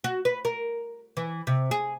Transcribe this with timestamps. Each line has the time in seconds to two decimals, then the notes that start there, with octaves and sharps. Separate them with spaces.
0.04 F#4
0.25 B4
0.45 A#4
1.17 E3
1.47 C3
1.71 G#4